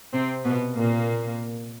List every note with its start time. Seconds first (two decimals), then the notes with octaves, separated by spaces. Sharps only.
0.13 C3 C4
0.44 B2 B3
0.75 A#2 A#3